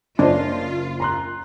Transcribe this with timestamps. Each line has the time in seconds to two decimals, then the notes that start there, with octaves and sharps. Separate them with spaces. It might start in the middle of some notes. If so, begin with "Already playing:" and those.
0.19 F#1 C#4 D4 F4 C5 D#5
1.00 A#5 C6 F#6